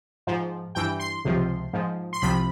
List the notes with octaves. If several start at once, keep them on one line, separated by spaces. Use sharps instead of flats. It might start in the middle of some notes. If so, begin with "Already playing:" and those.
G#2 F3
G2 E3 G5
C6
C#2 C3 F3
G#2 F3
C6
C2 C3 F3 B5